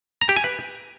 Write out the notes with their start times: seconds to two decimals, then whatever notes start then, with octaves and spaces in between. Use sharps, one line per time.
0.21 A#5
0.29 G4
0.36 G#5
0.44 B4